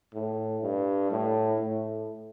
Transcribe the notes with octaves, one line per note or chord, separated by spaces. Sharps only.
A2
G2
A2
A2